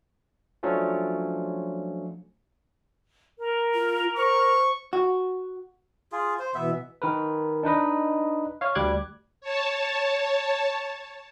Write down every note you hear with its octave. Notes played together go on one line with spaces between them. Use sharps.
F3 F#3 A3 C#4 D4 F4
A#4
F4
C5 C#6
F#4
F4 G#4
C5
B2 E3 B3 E5
D#3 A#4 B4
D4 D#4 B4 D#5
C#5 F5
D2 G3 D6 F#6 G#6
C#5 A5